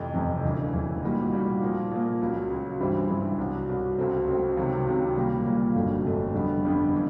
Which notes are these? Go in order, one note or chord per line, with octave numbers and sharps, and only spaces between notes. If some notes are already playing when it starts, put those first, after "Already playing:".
Already playing: F1 F2 C3 E3
F1 F2 C3 E3
E1 D2 C#3 E3
E1 D2 C#3 E3
A#2 G3 A#3 D#4 F#4
A#2 G3 A#3 D#4 F#4
A#2 F3 A#3
A#2 F3 A#3
C#2 C#3 F#3
C#2 C#3 F#3
G2 E3 G3 C4 E4
G2 E3 G3 C4 E4
C2 B2 F#3
C2 B2 F#3
C#2 C#3 F#3 A3 C4
C#2 C#3 F#3 A3 C4
C#2 C3 D#3 F#3
C#2 C3 D#3 F#3
A#2 G3 A#3
A#2 G3 A#3
G1 F2 C#3 F#3 A3
G1 F2 C#3 F#3 A3
F2 D3 G3 B3
F2 D3 G3 B3
C#3 E3